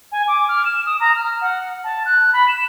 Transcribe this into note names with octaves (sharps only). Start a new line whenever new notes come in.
G#5
D6
F6
E7
D#6
A#5
F6
F#5
A5
F#6
B5
E7